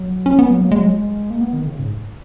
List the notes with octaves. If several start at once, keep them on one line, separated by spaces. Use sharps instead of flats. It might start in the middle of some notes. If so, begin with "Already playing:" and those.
Already playing: F#3
C#4
B3
F#3
A#3
G#3
F#3
G#3
A#3
B3
D#3
C#3
G#2